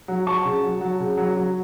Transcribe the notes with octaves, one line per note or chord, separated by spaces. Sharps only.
F#3
F#3 A5 C#6
C#3
F#3
F#3
C#3
F#3
F#3